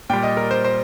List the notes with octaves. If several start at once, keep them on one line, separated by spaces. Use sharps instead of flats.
A#2 G3 G5
D#5
A#4
C5
C5